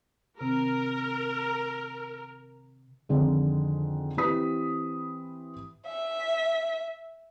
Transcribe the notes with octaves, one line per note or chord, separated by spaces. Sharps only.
C3 D#3 C4 A#4
F2 D3 D#3 G#3
E3 C4 G4 B4 D#6 B6
E5